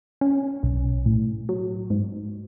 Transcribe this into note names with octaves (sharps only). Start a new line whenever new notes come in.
C#4
B1
A2
F#3
G#2